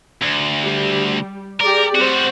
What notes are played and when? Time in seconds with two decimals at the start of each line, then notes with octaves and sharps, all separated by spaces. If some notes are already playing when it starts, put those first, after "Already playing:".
0.22 D2
0.63 G3
1.60 G4 G#4 A#4 D5
1.95 G3 C4 F#4 C5